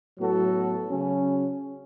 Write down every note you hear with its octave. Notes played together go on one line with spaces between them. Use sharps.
A2 F#3 B3 F#4 A4
C#3 F#3 C#4